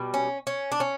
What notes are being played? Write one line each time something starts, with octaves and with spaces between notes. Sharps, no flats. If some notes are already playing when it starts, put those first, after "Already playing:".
Already playing: B2 G3
C#4
C#4
D4
C#4